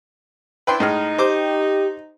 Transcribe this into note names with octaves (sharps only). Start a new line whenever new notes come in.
D4 E4 B4 G5 C6
A2 G#3 D#4 F6
G4 C5 D6